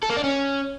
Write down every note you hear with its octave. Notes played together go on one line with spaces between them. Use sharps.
A4
A#3
D4
C#4